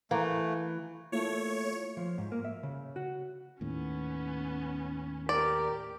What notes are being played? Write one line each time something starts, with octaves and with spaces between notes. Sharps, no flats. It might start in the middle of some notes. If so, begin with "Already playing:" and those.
E3 A3 A#3
A3 A#3 E4 F4 C#5
F3
G#2
A#3
E5
C#3
F#4
D#2 A2 B3 C#4
G4 A#4 D5